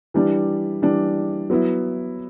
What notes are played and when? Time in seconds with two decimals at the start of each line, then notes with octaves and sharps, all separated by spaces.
0.14 E3 G3 D4
0.82 E3 G3 D4
1.50 F#3 B3 E4